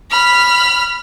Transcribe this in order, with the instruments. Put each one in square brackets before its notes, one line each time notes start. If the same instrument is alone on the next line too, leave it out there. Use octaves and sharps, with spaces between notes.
[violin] B5 F6